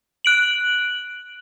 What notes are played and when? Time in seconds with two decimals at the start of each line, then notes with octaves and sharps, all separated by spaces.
0.25 F#6 D7 F#7